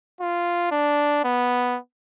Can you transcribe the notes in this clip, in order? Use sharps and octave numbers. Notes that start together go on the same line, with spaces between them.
F4
D4
B3